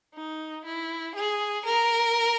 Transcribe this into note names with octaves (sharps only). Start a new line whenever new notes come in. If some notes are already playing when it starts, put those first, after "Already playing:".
D#4
E4
G#4
A#4